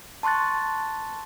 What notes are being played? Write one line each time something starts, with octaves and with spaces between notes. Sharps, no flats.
A5 C6 C#6 F#6 A6